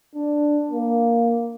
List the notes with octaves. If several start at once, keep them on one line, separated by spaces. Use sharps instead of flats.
D4
A#3